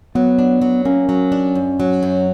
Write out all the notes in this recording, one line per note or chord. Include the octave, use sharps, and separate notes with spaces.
F#3 B3
D4
F#3
A#3 C#4
F#3
D4
F#2
F#3
F#2